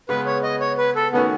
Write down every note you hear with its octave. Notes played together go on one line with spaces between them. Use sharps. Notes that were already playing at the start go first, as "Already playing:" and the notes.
C#3 G#3 B3 B4
C#5
D#5
C#5
B4
A4
D#3 A3 B3 C#4 F#4